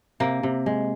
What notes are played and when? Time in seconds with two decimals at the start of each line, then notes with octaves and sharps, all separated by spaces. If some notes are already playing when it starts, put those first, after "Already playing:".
0.20 C3 A#3
0.43 C3
0.66 G#3